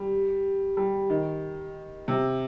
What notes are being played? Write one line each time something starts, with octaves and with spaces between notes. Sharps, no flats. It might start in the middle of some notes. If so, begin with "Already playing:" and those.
Already playing: G3
G3
D#3
C3